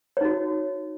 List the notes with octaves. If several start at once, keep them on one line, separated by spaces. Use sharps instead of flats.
D#4 F#4 C#5